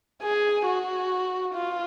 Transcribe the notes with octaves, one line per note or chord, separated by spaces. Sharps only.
G#4
F#4
F4